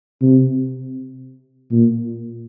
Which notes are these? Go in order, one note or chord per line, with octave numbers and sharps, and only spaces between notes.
C3
A#2